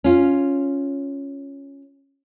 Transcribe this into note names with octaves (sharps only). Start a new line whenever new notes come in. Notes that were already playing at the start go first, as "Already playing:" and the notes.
C#4 F4